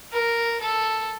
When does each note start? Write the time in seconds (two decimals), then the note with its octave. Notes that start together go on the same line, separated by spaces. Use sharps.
0.12 A#4
0.61 A4